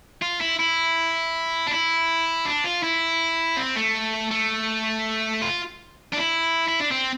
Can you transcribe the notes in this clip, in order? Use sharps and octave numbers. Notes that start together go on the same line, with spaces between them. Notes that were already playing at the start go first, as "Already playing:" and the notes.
F4
E4
E4
D4
E4
D4
F4
E4
C4
A3
A3
F4
D4
E4
E4
D4
C4